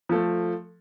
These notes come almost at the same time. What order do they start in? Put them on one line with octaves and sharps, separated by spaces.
F3 A4 A3